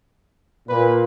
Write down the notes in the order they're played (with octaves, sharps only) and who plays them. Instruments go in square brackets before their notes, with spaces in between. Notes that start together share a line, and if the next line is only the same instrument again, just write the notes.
[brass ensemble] A#2 [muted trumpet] B4